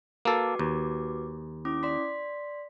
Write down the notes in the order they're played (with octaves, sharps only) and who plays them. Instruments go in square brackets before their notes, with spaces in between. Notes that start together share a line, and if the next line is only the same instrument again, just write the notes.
[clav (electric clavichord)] A#3 A4 [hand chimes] F#4 B4 D6
[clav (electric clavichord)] D#2
[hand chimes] C#4 E4 D6
D5 C6 B6